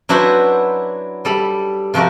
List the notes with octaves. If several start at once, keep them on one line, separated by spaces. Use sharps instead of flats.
F#3 D4 E4 F#4 B4 C5
G3 A4 B5
C3 F3 F#4 A#4 D5